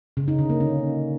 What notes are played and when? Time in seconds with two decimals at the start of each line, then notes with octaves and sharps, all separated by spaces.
0.17 C#3
0.28 D#4
0.39 D3
0.50 A#3
0.60 C#4